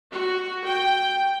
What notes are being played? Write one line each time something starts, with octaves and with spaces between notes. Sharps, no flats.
F#4
G5